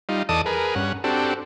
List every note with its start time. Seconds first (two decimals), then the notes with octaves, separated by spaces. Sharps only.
0.09 G3 D#4 F4
0.29 E2 A4 D5 D#5 A5 D#6
0.46 G#4 A#4 B4
0.75 G2 C#4 F#5
1.04 C4 D4 F#4 G4 A4